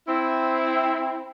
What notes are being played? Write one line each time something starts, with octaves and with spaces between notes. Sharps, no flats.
C4 E4